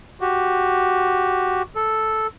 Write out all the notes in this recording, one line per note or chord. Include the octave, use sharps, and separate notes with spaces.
F#4 G4
A4